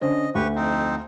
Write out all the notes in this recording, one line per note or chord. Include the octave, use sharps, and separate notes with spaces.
D3 C#4 C5 D#5
D2 G4 B4 C#6
F2 C4 D#4